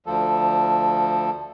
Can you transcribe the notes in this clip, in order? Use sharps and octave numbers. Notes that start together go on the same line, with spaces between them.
D2 F3 A4